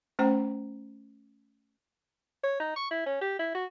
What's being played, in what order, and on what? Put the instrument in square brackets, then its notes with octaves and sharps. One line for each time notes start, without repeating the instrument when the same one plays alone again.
[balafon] A3 C#4 C5 G5 A#5
[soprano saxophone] C#5
D#4
C#6
E4
C#4
G4
E4
F#4